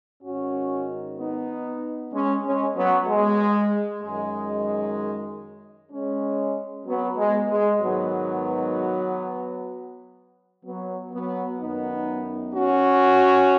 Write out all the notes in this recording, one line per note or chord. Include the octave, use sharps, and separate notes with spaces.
G#2 D#3 C#4 F#4
B3 D#4
G#3 C#4
G#3 C#4
F#3 B3
G#3
F#2 D#3 G#3
G#3 C#4
F#3 B3
G#3
G#3
G#2 D#3 F#3 B3
F#3 B3
F#3 B3
F#2 D#3 B3 D#4
C#4 F#4